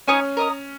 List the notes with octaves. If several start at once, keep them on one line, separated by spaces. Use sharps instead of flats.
C#4 D#4 C#5 G#5 D#6
A#4 D#5 A#5 D#6